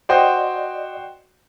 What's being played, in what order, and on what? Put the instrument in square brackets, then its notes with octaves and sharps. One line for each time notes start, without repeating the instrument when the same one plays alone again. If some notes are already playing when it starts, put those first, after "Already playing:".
[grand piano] F#4 C5 G5 [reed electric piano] D5 D#5